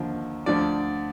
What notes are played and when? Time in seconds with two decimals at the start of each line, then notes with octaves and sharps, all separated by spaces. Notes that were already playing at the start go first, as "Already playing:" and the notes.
Already playing: D#2 D3 F3
0.46 D2 D3 F3 D5